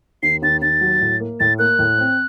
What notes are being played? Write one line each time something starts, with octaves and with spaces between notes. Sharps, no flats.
D#2 C7
D#2 A6
D#2 A6
F#3
A2
A#3
A2 A6
A#3 F#6
A2
C4